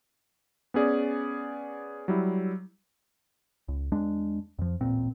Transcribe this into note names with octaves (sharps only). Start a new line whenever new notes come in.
B3 C#4 G#4 D5
F#3 G3 E4
C#2
E2 G#3 D4
F2 F3
D#1 A1 A#2 C4